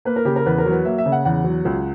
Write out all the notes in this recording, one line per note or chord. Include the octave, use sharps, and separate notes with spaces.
A#3 B4
A#4
C#3 G4
A#4
E2 B4
A#4
F#3
B4
A#3 E5
E5
C#3
F#5
E2 F#5
F#3
C#2